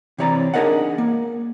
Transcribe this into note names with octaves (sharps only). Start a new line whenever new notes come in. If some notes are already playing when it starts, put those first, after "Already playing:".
C3 E3 C#5 D5 A#5
D4 D#4 G#4 A#4 D#5 F#5
A#3